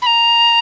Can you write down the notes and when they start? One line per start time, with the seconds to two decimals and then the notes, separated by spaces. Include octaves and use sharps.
0.02 B5
0.06 A#5